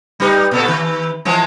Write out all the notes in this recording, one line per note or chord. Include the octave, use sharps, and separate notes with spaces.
G3 D#4 B4
A#2 B3 A4
D#3 B4
E3 F3 G#3